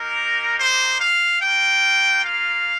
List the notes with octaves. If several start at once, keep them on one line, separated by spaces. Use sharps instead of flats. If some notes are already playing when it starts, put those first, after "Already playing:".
Already playing: A#3 D#4 G4 A#4
C5
F5
A#3 F4 G5
F5